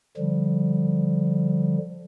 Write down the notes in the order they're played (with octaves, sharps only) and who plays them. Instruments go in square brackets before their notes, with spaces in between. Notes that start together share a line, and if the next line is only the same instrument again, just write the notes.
[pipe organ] D3 F3 G3